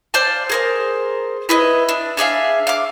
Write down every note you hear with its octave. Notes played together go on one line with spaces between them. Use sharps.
C5 D5 F5 A5
G#4 A#4 C5
E4 B4 D#5
D4
D4 G#4 E5 F5
F5 D6